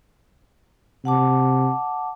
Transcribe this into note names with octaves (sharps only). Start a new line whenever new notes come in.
C3 F#5 A5 D6